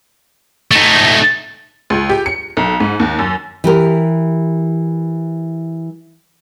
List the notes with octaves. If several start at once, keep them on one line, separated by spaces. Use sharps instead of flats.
A3 D#4
C#2
G4
C#7
B1
G#2
D#2
F#2
E3 G4 A#4